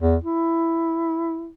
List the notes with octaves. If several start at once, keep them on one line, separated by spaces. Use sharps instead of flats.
E2
E4